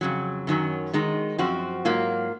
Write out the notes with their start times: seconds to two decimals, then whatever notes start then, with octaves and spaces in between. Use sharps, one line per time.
0.01 F2 C#3 F#3
0.47 F#2 D#3 F#3 C#4
0.93 D#3 G#3 D#4
1.38 F#2 F3 C4 F#4
1.85 G#2 F#3 A#3 F4